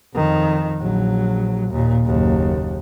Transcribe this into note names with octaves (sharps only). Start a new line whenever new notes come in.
F2 D#3
A#1 F#3
D#2 A#2
F#1 D#2